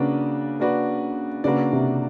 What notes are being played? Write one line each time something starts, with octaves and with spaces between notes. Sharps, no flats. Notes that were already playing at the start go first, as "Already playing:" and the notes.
Already playing: C#3 A#3 D4 F#4 B4 D5
A#3 D4 F#4 B4 D5
C#3 A#3 D4 F#4 B4 D5
C3